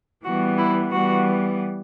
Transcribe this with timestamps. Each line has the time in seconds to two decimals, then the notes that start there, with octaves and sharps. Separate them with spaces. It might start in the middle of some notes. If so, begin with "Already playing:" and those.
0.25 E3 G3 B3 F#4
0.58 E4
0.91 E3 G3 B3 F#4